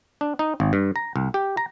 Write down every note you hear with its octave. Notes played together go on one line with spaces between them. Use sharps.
D4
D#4
G#1
G2
A#5
C2
G4
A#5